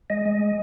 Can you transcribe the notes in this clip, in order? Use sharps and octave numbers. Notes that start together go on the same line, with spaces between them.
G#3 D#5
G#3